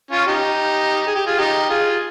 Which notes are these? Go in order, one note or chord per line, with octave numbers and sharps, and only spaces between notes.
C#4 F4
D#4 G4
G#4
G4
F4 G#4
D#4 G4
F4 G#4